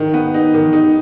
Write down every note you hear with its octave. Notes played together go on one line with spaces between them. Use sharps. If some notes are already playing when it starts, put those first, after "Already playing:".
Already playing: D#3
B3
D#4
D#3
D#4